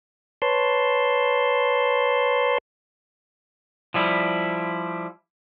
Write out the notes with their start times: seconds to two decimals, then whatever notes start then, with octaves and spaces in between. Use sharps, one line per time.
0.42 B4 C#5 A5 C6
3.94 F3 G3 E4